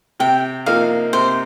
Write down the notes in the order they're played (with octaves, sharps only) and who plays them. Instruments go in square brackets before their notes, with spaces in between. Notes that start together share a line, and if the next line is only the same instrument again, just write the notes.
[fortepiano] C3 [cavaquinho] G5
[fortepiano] F3 A#3 D#4 [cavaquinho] F5
[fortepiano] C3 [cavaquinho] C5